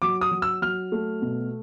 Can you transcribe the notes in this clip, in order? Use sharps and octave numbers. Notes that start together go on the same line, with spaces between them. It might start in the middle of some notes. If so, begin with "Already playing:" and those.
F#3 D6
D#6
F#3
E6
F#3 F6
A3
B2